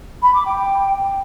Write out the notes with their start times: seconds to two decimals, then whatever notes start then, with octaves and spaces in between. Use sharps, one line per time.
0.22 B5
0.33 D6
0.44 G5